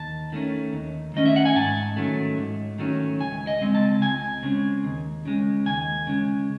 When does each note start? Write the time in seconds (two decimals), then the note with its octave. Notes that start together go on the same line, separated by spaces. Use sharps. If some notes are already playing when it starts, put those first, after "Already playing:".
Already playing: D#2 A5
0.32 D#3 A3 C#4
0.73 D#2
1.14 D#3 A3 C#4 D#5
1.26 E5
1.36 F#5
1.45 G#5
1.55 G#2 A5
1.96 D#3 F#3 A3 C#4
2.38 G#2
2.78 D#3 F#3 A3 C#4
3.20 C#2 G#5
3.47 D#5
3.61 C#3 G#3 C4
3.75 A5
4.02 C#2 G#5
4.42 C#3 G#3 C4
4.84 D#2
5.25 C#3 G#3
5.66 D#2 G#5
6.07 C#3 G#3